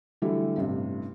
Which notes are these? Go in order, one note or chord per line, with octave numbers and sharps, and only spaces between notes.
D3 E3 F#3 G3 A3 E4
A1 G2 C3